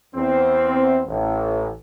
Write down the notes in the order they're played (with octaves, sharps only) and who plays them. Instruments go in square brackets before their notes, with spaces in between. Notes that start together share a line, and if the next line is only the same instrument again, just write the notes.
[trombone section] E2 C4
A1